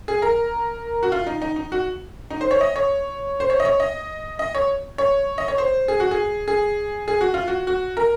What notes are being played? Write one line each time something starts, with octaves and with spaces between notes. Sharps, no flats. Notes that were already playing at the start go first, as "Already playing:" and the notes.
G#4
A#4
F#4
F4
D#4
D#4
D#4
F#4
D#4
C5
C#5
D#5
C#5
C5
C#5
D#5
C#5
D#5
D#5
C#5
C#5
D#5
C#5
C5
G#4
F#4
G#4
G#4
G#4
F#4
F4
F#4
F#4
A#4